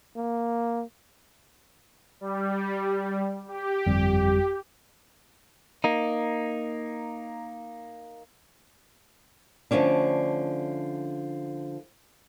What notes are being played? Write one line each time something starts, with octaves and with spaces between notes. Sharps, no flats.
A#3
G3
G4
G1 F2 G3
A#3 D#4
D3 F3 A3 C#4 D4